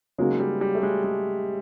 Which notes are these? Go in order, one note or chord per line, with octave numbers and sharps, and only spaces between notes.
C#3 F#3 G#3 A#3 D#4 F#4
G3
G3
A3
G#3
G#3